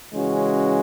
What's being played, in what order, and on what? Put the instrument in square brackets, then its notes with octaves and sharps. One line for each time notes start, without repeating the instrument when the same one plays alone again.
[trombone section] C#3 E3 G#3 C#4 F#4